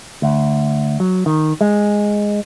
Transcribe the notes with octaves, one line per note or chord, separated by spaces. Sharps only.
D2
F#3
D#3
G#3